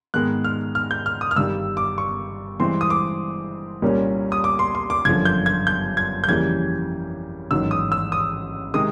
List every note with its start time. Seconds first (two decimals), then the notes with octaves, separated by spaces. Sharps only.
0.14 G#2 D#3 G#3 B3 F#6
0.44 F6
0.75 F6
0.91 G6
1.06 F6
1.21 D#6
1.31 F6
1.36 G1 G2 D#3 G3 E6
1.77 D6
1.98 C#6
2.60 G2 E3 G#3 C4 C6
2.81 D#6
2.90 D6
3.82 C2 A#2 G3 A#3 C#4
4.32 D#6
4.44 D6
4.59 C6
4.75 C6
4.90 D6
5.05 G1 F#2 D3 F3 G#6
5.25 G6
5.46 G#6
5.67 G6
5.97 G#6
6.24 G6
6.28 F2 C#3 E3 G3 A#3 G#6
7.51 A1 G#2 D#3 F#3 E6
7.71 D#6
7.92 E6
8.12 D#6
8.74 C3 D#3 G#3 D#6